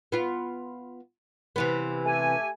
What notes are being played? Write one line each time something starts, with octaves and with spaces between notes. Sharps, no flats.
B3 F4
C3 E3 B3
A3 G4 G#5